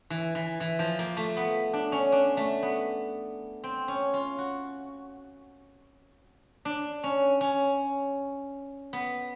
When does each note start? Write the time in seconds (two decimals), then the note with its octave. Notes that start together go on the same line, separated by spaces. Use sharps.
0.10 E3
0.35 E3
0.60 E3
0.79 F3
0.99 A#3
1.17 A3
1.37 B3
1.73 D4
1.92 C#4
2.12 D4
2.37 A3
2.63 B3
3.64 C4
3.88 C#4
4.14 F4
4.38 F#4
6.65 D4
7.04 C#4
7.41 C#4
8.93 B3